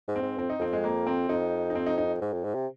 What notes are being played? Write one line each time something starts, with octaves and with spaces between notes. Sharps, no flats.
G#2
C4
G#2
F2 C4
D#4
F2 C4
G#3
A#3
C4
F2 D#4
D#4
C4
D#4
D#4
G#2
F2
G#2
C3